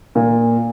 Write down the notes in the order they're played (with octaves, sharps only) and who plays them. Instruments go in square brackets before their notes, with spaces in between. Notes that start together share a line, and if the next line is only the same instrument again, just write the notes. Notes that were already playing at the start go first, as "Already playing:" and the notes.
[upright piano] A#2